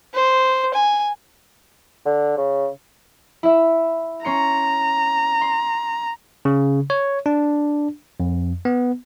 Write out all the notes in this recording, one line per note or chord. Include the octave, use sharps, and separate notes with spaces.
C5
G#5
D3
C#3
E4 E5
C#4 A#5 C6 C#7
C6
C#3
C#5
D4
F2
B3